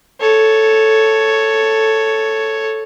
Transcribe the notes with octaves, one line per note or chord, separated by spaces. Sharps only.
A4 C#5